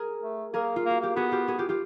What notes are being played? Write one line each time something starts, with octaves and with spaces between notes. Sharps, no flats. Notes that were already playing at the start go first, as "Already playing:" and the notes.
Already playing: G#4 A#4
A3
A#3 G#4 A#4
F4
A#3 F#4
A#3 G4
B3 F#4 G#4
F4 G4
F#4 G#4
F4 G4
F4 G4